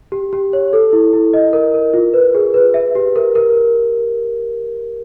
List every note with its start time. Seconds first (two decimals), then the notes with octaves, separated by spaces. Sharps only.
0.12 G4
0.33 G4
0.53 C#5
0.73 A4
0.93 E4
1.13 E4
1.34 D#5
1.53 A#4
1.74 A#4
1.94 F4
2.14 B4
2.35 G#4
2.54 B4
2.74 E5
2.95 G4
3.16 A#4
3.35 A#4